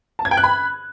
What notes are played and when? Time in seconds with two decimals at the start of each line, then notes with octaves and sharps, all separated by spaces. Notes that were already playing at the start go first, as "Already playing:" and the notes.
0.19 A5
0.25 G#6
0.31 G5
0.37 F#6
0.44 B5